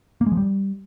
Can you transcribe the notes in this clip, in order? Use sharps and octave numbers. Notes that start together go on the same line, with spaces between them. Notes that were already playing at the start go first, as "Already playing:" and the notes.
A#3
G#3
F3
G3